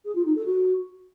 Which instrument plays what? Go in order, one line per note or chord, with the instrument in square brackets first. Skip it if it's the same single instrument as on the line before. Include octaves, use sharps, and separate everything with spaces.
[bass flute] G#4
F4
D#4
A4
F#4